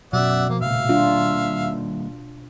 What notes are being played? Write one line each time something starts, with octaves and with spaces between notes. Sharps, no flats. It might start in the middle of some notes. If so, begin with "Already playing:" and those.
B2 F#3 C#4 D5 E5 F#5
F3 A#3
A#2 C#3 A3 E5 F5
D#3 G3 A#3 D4 F4